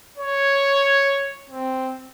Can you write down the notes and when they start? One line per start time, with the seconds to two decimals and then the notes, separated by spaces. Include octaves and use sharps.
0.17 C#5
1.50 C4